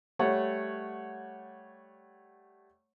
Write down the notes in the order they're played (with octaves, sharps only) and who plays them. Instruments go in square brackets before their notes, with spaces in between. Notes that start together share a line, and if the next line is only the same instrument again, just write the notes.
[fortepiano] G3 A3 C#5 F#5